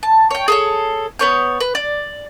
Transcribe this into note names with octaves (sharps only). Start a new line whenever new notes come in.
A5
C#5 G5
G#4 A4 C#5
B3 C#5 G6
B4
D5